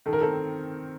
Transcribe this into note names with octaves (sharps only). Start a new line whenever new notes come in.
D#3 A4
A#4
C4 A4